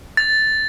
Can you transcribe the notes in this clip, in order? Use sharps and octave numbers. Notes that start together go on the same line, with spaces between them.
A6